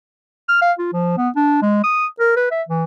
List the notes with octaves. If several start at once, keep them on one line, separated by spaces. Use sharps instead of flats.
F6
F5
F4
F3
B3
D4
G#3
D#6
A#4
B4
E5
E3